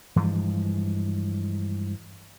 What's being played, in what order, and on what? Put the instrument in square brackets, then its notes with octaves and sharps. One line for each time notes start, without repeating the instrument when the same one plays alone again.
[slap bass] G2 E3 F3 G#3